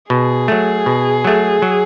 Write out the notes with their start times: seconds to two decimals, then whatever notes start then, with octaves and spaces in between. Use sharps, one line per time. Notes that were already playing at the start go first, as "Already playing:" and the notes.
0.10 B2 G#4
0.48 F#3 A3
0.86 B2
1.24 F#3 A3
1.62 F#3